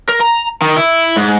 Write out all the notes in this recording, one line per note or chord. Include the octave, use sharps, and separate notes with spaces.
A#4
A#5
D#3
E4
G#2